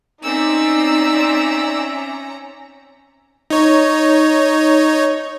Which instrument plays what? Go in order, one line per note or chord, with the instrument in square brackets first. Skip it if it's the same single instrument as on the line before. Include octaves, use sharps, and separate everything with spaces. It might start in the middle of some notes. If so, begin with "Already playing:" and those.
[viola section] C4 D5 E5 [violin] C#4 A#5 [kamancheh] D#4 [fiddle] E6
[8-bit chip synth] D#4 C#5